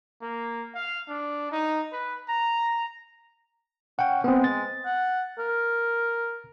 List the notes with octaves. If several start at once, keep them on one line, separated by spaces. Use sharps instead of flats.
A#3
F5
D4
D#4
B4
A#5
C#4 F#5 G5
G#3 B3 C4
A6
F#5
A#4